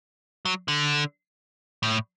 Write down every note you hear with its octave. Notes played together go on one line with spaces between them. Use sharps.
F#3
D3
A2